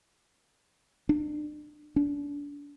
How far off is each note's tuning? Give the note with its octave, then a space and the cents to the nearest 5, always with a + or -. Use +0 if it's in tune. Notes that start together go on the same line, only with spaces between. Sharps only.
D4 +35
D4 -30